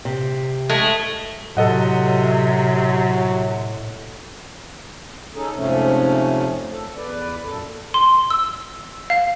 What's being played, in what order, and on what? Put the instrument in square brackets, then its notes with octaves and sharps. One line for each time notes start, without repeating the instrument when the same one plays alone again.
[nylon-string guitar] C3
[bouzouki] G#3 [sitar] A3
[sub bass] A2 [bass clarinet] C3 [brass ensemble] F#3 [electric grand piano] A4 D#5 F#5
[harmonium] C#4 D#4 G#4 A4
F2 G#2 C3 F3 A3 C#4
A4
E2 B4 D5
F#2 A#2 A4
[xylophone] C6
E6
F5